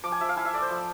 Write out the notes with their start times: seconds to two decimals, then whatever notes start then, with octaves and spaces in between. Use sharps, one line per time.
0.04 F3 D6
0.12 G#5
0.21 F3 E5
0.29 F5
0.36 E4 G#5
0.45 E5
0.53 A3 D5
0.62 C5
0.70 F3